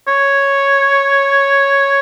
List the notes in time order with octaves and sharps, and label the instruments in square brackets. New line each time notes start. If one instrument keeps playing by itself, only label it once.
[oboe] C#5